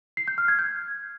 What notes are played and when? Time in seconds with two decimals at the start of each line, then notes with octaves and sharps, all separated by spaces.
0.17 C7
0.28 G6
0.38 F6
0.48 G#6
0.59 G6